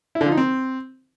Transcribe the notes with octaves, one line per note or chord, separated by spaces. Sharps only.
E4
D3
F3
D#4
C4